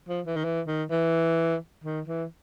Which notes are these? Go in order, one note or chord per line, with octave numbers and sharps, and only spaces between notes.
F3
E3
D#3
E3
D#3
E3
D#3
E3